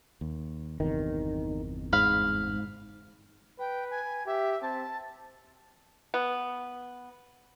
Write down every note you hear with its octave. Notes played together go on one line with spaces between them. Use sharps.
D#2
G1 E2 C3 D#3
G#2 F5 B5
B4 G5
G#5
G4 E5
C4 A5
B3